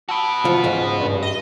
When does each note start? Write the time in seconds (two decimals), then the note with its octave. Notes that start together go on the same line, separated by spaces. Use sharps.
0.09 F#4 B4 A5 E6 D7
0.45 E3 F3 F5
0.64 C#2 G#2
1.00 G2
1.23 D#5